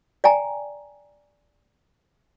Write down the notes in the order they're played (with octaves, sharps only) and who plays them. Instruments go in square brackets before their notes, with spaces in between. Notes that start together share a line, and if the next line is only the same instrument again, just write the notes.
[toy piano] D5 G5 G#5 A#5